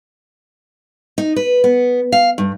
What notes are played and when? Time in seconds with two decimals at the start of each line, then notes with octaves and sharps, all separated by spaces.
1.18 D#4
1.36 B4
1.64 B3
2.12 F5
2.38 G2